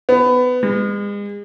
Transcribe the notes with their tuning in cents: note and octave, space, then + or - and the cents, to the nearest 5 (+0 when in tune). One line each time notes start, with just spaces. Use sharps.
B3 +20
G#3 -35